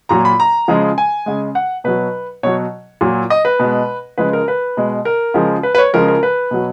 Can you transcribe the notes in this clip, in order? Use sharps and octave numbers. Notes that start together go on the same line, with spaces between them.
A#2 F#3 A#5
B5
A#5
C#3 F3 G#3
G#5
C#3 G#3
F#5
B2 F#3 B4
B2 F#3 C#5
A#2 F#3
D#5
B4
B2 G#3
C#3 F3 G#3 B4
A#4
B4
B2 G#3
A#4
C#3 F3 G#3
B4
B4
C#5
C#3 F3 G#3 A#4
A#4
B4
B2 F#3